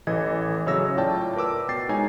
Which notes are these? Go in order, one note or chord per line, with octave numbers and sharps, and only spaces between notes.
A1 E3 A4 D#5 G#6
C#3 F#3 C#5 E5 E6 A#6
A2 F4 C#5 D5 G5 A5
A#4 B4 D6 E6
B2 G5 A6 C7
G#3 D#4 C#5 G#5